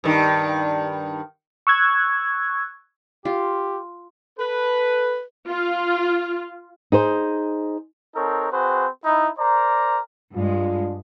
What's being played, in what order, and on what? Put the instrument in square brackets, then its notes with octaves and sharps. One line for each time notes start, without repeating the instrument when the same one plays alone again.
[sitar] G2 D#3
[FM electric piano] C#6 E6 F#6 G#6
[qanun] F4 [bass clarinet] G4
[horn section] A4 B4
[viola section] F4
[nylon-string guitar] D#4 G#4 C5
[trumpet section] C4 D#4 A4 A#4 C#5
C4 F#4 G#4 B4 C5
D#4 E4
A#4 C5 D5 A#5
[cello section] G2 G#3 [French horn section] D4 F4